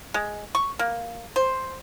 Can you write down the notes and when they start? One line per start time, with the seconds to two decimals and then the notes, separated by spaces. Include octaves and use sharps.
0.14 G#3
0.55 C#6
0.79 A#3
1.36 C5